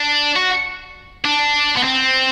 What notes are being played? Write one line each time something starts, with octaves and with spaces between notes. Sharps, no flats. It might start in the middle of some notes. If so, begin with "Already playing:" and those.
Already playing: D4
F#4
D4
B3
C4